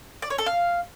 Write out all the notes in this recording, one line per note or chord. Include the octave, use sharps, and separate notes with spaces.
D5
C#5
A4
F5